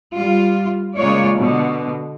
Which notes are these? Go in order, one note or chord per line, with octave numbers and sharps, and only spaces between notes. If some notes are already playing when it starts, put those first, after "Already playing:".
G3 F4
C#3 G#3 A#3 F4 C#5 D5
B2 D3